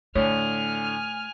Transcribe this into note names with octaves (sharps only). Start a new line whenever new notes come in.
A2 D3 A3 D4 C#5 G#5 F6